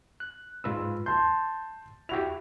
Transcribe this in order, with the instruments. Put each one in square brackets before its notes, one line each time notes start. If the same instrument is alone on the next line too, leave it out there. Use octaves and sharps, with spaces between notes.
[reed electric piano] F#6
[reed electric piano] G#2 B4 E6 [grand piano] F4
[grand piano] A5 C6 [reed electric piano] G6
[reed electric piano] E4 F#4 G4 [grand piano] F7